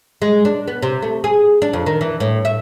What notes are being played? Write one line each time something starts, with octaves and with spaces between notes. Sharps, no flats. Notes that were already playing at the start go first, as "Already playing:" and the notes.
G#3
D4
B3
C3
A3
G#4
D4
F2
D#3
E3
A2
E5